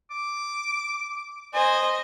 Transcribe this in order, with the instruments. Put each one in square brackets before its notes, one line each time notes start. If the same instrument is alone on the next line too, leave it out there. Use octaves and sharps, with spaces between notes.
[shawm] D6
[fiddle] C5 G#5 [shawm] D#5